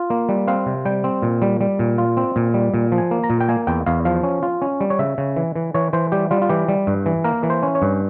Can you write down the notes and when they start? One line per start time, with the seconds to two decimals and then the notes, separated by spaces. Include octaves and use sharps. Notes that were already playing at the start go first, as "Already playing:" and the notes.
Already playing: F4
0.10 A#3
0.29 G3
0.47 C4 F5
0.66 C3
0.85 G3 G5
1.04 C4
1.22 A#2
1.42 G3
1.61 G3
1.79 A#2
1.98 F4
2.17 C4
2.36 A#2
2.54 G3
2.74 A#2
2.92 F3
2.98 G#5
3.11 A#3
3.24 A#5
3.30 A#2
3.40 G5
3.49 A#3 G#5
3.67 E2 G5
3.86 E2 F5
4.05 F3 F5
4.23 C#4
4.43 F4
4.62 C#4
4.80 G3
4.90 C#5
4.99 C#3 E5
5.18 C#3
5.36 E3
5.56 E3
5.74 E3 C#5
5.93 E3 C5
6.12 G3 G4
6.31 G3 F4
6.42 F4
6.50 E3 G4
6.69 G3
6.87 G2
7.06 E3
7.24 A#3 A#4
7.43 E3
7.50 C5
7.63 C#4
7.75 C#5
7.82 G2